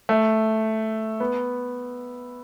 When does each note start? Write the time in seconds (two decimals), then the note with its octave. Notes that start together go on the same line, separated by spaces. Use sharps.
0.09 A3
1.20 B3